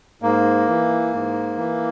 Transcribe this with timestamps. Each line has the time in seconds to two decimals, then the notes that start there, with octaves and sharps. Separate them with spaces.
0.22 G#2 A#3
0.67 E3
1.13 G#2
1.57 E3